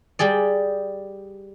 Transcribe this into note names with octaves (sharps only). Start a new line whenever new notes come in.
G3 G4 G#4 D5